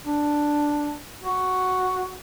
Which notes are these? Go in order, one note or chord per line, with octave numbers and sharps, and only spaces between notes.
D4
F#4